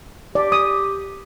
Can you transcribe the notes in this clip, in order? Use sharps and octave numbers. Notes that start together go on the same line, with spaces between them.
G4 D5
D#6